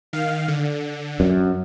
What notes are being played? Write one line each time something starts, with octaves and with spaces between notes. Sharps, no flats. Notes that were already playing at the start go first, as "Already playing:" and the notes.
D#3 F5
D3
F#2